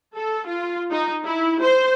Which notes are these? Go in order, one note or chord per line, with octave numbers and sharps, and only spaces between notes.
A4
F4
D#4
E4
C5